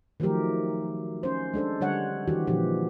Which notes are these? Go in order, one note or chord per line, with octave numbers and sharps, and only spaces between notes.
D#3 F3 F#3 A3 G4 A#4
C#4 C5
G#3 D4 A4 C5
D3 G3 C#5 F#5
D#3 E3 F#4 G4
A#2 D3 E3 F3 G4